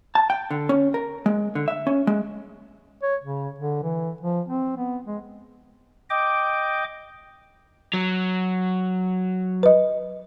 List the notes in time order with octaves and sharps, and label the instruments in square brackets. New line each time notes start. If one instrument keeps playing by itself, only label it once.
[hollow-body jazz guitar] A5
G5
D3
C#4
A#4
G#3
D3
E5
C#4
G#3
[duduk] C#5
C#3
D3
E3
F3
C4
B3
G#3
[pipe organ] D#5 G5 D6
[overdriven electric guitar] F#3
[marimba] B4 D#5